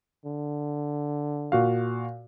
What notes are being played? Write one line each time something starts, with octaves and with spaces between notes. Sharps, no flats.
D3
A#2 F#4 F5